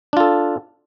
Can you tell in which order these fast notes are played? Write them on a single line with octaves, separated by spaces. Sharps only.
D4 F4 A4